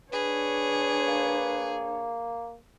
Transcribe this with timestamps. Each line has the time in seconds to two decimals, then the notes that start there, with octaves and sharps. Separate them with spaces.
0.12 D4 G#4 B4 C#5
1.07 A#3